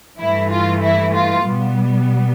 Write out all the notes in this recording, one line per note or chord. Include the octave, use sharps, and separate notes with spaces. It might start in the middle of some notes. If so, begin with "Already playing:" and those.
G2 E3 A3 E4
F4
E4
F4
B2 G3 B3